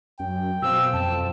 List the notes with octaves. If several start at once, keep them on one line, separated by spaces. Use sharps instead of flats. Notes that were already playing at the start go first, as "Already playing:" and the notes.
F#2 G5
F#2 B2 C4 F4 E6
F2 A5